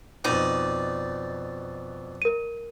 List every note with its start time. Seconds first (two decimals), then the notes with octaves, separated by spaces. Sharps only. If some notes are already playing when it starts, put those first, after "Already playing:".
0.24 F2 B2 D#4 D5
2.22 A#4 D#7